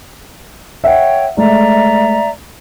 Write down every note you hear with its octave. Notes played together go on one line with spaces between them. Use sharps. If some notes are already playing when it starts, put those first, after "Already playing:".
C#5 E5 F#5 G5
G#3 A3 D5 E5 A#5